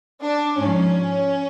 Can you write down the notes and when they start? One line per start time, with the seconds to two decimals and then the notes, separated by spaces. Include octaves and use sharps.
0.22 D4
0.57 G#2 F3 C#4